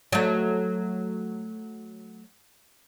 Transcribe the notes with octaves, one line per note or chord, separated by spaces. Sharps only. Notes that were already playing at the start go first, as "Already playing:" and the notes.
F#3 A3